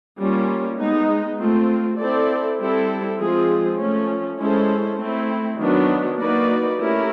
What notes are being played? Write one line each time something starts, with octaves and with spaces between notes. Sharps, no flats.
G3 A#3 C#4 F4
G#3 B3 D#4
A3 C4 F4
C4 E4 A4 D5
G3 C4 E4 A4
F3 G#3 C4 F4 G#4
F3 A3 C#4
G#3 C#4 E4 A4 C5
A3 C4 E4
D#3 F#3 B3 D4
A#3 D#4 F#4 B4 D5
A3 C#4 E4 G4 A#4